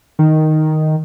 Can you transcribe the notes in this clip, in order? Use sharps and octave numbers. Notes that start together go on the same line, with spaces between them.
D#3